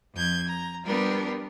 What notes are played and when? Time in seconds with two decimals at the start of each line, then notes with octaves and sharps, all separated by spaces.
0.14 F2 G6 G#6
0.47 A#5
0.85 G3 B3 D4 F4 G4 A#4